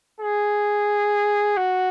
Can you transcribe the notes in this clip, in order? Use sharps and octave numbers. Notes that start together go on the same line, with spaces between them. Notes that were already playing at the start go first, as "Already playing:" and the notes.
G#4
F#4